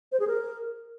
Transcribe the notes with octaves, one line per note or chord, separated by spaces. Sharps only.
C5
G#4
A#4